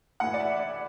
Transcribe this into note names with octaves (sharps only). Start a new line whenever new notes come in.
A2 E3 F#5
D5
E5
D5